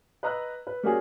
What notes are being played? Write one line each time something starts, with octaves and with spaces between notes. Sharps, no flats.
B4 D#5 A#5 E6 F#6
B4
G3 A#3 C#4 F#4 G#4